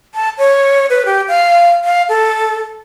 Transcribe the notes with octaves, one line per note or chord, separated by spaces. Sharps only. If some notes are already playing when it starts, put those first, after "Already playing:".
A5
C#5
B4
G4
F5
F5
A4